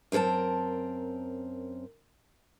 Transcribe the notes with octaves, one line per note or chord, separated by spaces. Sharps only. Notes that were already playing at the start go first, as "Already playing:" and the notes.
F#2 C4 A4 A#4 A5